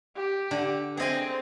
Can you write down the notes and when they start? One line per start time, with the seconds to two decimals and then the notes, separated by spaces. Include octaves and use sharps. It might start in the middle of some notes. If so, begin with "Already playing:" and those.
0.16 G4
0.51 D3
0.97 C4 G#4 D#5 G#5